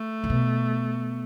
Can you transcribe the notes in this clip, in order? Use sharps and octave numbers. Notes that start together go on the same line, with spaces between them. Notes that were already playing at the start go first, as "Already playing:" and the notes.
Already playing: A3
A2
B2